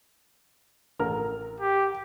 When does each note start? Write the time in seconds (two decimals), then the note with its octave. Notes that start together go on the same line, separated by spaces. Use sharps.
0.99 A1 A#4 F6
1.60 G4